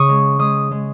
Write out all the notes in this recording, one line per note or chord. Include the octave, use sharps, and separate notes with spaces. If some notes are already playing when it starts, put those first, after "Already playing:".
Already playing: C#3 C#6 D#6
G#3
G#3 D#6
G#3